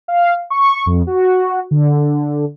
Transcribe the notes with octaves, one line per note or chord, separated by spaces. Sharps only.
F5
C#6
F2
F#4
D3